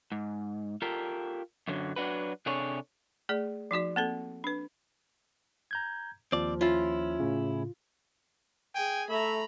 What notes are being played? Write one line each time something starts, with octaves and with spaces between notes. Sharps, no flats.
G#2
F4 G4 A4 A#4
F#2 D3 F#3
F#3 D4 D#4 F#4 B4
C3 D4 G#4 A4 C#5
A3 G#4 D5
F3 D#4 F#4 D5
A#3 C4 A4
D4 B4
A#5 G6 G#6
D#2 F3 C4 D5
C#4 E4 F4
A2 C#3
G#4 G5 G#5
A3 E5 A#5 B5